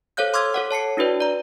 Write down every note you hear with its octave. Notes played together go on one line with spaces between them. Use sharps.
A4 C5 C#5 F5 F#6 G6
C6 D6 E6 F6 G#6
A4 C#5 F#5
C#5 A5 C7 C#7
D4 E4 F#4 B4 D5
D5 A#5